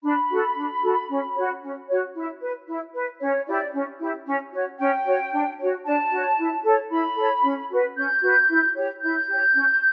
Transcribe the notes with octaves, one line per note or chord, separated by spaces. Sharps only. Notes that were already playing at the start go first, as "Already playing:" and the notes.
D4 B5
F#4 A4
D4
F#4 A4
C#4
F#4 C#5
C#4
F#4 C#5
E4
B4
E4
B4
C#4 C#5
E4 G4 D5
C#4
E4 G4
C#4
F#4 C#5
C#4 G5
F#4 C#5
D4
F#4 C#5
D4 A5
F#4 C#5
E4
A4 C#5
E4 B5
A4 C#5
C#4
F#4 B4
C#4 G6
F#4 B4
E4
G4 C#5
E4 G6
G4 C#5
C#4